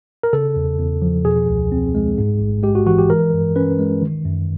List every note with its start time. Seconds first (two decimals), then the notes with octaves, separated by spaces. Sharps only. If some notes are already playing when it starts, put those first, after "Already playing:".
0.23 A#4
0.33 C#3 A4
0.56 E2
0.79 E2
1.02 F3
1.25 B2 G#4
1.49 C#2
1.72 C4
1.95 G#3
2.18 G#2
2.40 A1
2.63 G#3 G4
2.75 F#4
2.86 E3 F#4
2.98 G4
3.10 E3 A#4
3.33 G2
3.56 C#4 B4
3.79 G#3
4.02 D#3
4.25 F#2